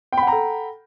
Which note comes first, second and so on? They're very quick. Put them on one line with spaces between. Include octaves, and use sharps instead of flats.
G5 B5 F#5 A#5 A4